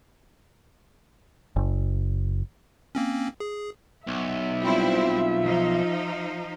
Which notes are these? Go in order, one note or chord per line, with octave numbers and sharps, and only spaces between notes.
F#1
A#3 C4 C#4
G#4
B1 E5
G3 C4 E4 F4
F3 D#4